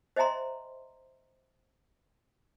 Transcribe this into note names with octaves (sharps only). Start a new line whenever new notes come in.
C5 D#5 E5 G#5 A#5 C6